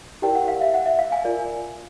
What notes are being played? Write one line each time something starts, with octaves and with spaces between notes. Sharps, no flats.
E4 G4 A#4 D5 G5
F#5
F5
E5
F#5
E5
F5
G#5
F4 A#4 D5